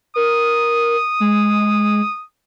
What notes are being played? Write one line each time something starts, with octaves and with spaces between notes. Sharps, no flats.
A#4 D#6
G#3